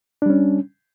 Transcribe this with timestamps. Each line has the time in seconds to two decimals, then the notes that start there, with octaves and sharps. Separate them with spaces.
0.22 D4
0.26 G3
0.30 C#4